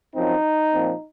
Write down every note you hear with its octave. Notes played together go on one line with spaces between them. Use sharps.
F#2 F3 C4 D#4
A#2 F3 C4